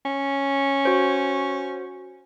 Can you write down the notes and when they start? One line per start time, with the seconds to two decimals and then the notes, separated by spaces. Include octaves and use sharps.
0.05 C#4
0.85 F#4 C5